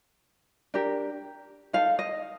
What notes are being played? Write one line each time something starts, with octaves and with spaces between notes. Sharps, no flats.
D4 G4 A#4
D#4 A4 F5
D#5